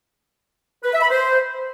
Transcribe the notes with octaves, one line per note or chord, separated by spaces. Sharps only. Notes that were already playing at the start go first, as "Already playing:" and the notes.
B4
E5
B5
C5